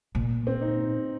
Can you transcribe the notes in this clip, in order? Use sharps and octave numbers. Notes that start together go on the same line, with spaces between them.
A#2
C4
D#4